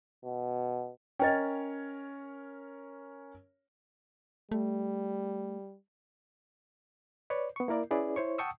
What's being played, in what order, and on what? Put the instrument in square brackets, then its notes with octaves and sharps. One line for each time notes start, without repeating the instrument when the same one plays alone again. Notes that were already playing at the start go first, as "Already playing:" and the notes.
[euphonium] B2
[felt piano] C#4 A#4 C#5 [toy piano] D#5 G5
[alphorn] G3 [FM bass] A3
[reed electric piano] B4 C#5 D5
B3 C#6
A#3 E4 A#4 D5
C#4 E4 G#4 B4 D5
E4 C5 C#5 C#6
F#5 G5 A5 C#6 D#6 E6